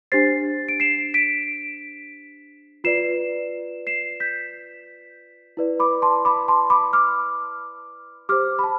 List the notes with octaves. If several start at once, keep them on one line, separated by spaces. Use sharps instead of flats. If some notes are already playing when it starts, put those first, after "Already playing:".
D4 G4 C5 A6 C7
D7
C7 E7
B6 D7
F4 B4 D5 C7 E7
C7 E7
G6 B6
E4 B4 D5
B5 D6
A5 C6
B5 D6
A5 C6
B5 D6
D6 F6
G4 C5 D6 F6
B5
A5